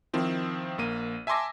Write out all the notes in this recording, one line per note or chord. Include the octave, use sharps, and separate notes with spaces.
D#3 F3 C4 E4
A#1 A#3 D#7
E5 G#5 A5 C6 D6 A#6